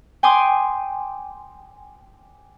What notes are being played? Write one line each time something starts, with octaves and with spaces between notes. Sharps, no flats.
G5 G#5 C6 D6 D#6